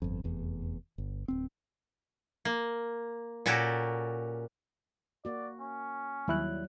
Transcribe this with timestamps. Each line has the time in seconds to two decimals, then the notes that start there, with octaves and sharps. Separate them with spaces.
0.02 G1 F2
0.24 F1 E2
0.98 G1
1.28 D1 C4
2.45 A#3
3.46 A#2 C#4 F#4 G4 A4 A#4
5.25 A#3 F#4 D5
5.61 C#4
6.28 D#2 F#3 G3 E4 F#6